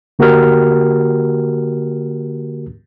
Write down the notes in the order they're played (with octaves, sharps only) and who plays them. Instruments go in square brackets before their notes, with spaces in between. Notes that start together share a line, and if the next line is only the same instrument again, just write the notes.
[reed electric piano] D3 A#3 F#4 G4 A#4 F6